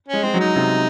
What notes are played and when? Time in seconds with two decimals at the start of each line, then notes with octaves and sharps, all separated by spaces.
0.09 G#3 C#4
0.23 G#3 C4
0.34 F#3
0.40 D#4
0.56 C3